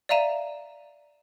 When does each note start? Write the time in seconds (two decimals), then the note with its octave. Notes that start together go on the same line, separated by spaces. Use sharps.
0.09 D5 E5 F5 A#5 D#7 E7